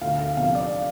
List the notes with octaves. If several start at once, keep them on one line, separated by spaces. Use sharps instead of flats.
D2 F5
F5
C3 F3 F5
D5